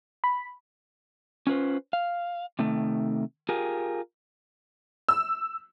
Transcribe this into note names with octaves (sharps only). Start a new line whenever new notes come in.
B5
C#4 F4 B4 C5
F5
C3 D#3 A3
F4 G4 G#4 A#4
E6